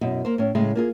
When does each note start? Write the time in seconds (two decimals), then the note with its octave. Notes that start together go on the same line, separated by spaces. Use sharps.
0.01 F#2 B2 E4 D#5
0.25 A#3 C5
0.38 A2 C#4
0.55 A2 C#3 G#3 A3
0.75 A#3 F4 G#4